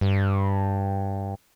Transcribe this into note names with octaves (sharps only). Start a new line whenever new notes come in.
G2